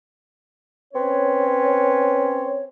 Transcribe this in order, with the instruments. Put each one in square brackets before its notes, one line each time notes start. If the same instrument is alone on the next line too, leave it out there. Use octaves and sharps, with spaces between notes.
[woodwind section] C4 C#4 B4 C#5